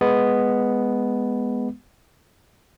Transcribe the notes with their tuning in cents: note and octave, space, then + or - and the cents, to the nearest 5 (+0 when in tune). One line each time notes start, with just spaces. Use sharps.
G#3 +0 B3 +0